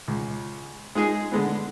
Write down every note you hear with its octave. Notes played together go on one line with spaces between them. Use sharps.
C#2
G#3 D#4 G#4
D3 G#3 B3